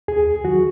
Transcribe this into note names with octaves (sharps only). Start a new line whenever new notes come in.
D#2 G#4
D#3 F#3 F#4